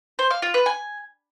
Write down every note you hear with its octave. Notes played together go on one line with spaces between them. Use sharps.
C5
F5
F4
B4
G#5